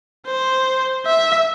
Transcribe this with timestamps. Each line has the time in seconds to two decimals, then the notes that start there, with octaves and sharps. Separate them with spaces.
0.27 C5
1.06 E5